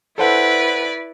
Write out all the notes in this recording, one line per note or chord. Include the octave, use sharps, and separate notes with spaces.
E4 A4 B4 C5 D5 F#5